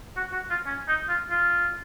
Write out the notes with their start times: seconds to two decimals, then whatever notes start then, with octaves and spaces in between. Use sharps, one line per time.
0.17 F#4
0.33 F#4
0.50 F4
0.66 C#4
0.88 D#4
1.09 F4
1.30 F4